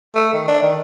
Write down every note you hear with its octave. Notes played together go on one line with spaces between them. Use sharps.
A3
D#3
D4
D#3